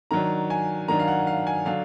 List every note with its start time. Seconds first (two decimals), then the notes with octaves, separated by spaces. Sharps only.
0.11 D#3 F#3 D4 A#5
0.50 G#5
0.88 D#3 F#3 D4 A#5
0.99 F5
1.08 F#5
1.27 F5
1.47 G#5
1.65 D3 F#3 D4 F5